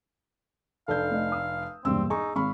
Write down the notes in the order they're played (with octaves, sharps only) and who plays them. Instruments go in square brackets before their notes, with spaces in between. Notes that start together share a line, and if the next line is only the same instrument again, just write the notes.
[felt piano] F1 D4 G6 [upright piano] A4 [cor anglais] F5
[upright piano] A3 D#5
D#6 E6
[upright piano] E1 G2 A#2 [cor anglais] C4 [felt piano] E6
[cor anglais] D#4 [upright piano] G#4 [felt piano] G#5 C#6
[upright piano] G#1 [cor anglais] F5 [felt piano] B5 C#6